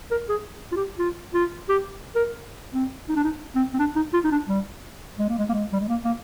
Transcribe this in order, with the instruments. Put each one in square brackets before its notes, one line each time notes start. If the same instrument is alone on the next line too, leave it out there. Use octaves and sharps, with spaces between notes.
[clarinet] A#4
G#4
F4
G4
F4
F4
G4
A#4
C4
D#4
D4
D#4
C4
C4
D4
D#4
F4
D#4
D4
G3
G#3
A#3
G#3
A#3
G#3
G3
G#3
A#3
A#3